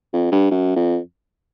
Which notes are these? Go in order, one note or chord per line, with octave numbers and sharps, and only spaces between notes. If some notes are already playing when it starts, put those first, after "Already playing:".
F2
G2
F#2
F2